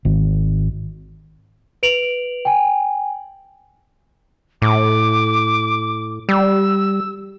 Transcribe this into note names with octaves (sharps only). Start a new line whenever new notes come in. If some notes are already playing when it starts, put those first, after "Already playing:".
G#1
B4 D7 F7 F#7
G5 G#5
A2 D6
G3 E6